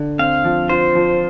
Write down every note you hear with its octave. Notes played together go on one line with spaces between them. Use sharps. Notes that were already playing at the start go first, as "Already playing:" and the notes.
Already playing: D3
C4 F5
F3
F4 C5
F3